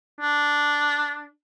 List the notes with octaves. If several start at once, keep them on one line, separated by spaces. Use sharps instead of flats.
D4